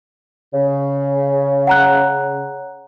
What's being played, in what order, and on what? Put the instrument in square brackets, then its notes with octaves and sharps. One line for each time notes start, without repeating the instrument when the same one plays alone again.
[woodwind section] C#3
[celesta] F#5 A#5 F#6